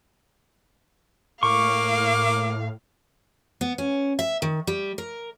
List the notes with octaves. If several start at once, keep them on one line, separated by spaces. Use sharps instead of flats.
A2 A#3 F5 C#6 D6
B3
C#4
E5
D#3
G3
A#4